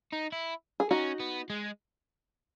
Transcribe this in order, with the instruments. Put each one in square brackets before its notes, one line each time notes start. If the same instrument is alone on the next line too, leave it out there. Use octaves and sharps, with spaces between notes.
[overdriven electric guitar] D#4
E4
[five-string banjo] G#4
[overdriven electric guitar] C#4 [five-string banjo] D#4 F#4
[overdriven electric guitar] B3
G#3